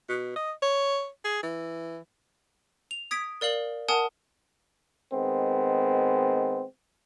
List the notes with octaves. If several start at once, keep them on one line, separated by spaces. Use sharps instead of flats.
B2
D#5
C#5
G#4
E3
F7
D#6 G#6 B6 D7
A#4 D5 F5 F#7
A#4 F#5 G#5 A5 D#6
D#3 G#3 B3 C4